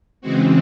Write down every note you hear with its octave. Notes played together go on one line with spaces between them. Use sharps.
C#3 E3 G#3 C4 F#4